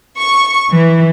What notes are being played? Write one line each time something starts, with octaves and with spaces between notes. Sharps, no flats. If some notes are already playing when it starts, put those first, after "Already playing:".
C#6
E3